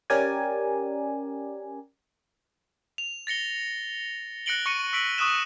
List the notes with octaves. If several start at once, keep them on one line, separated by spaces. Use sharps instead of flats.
C#4 G4 A#4 D5 G#5
F7
A6 A#6 C#7 G7
F#6 A#6 C#7 D7 F#7 G7
C#6 A#6 C#7 D#7
C#6 E6 B6 D7 F#7
C#6 D#6 E6 F#6 E7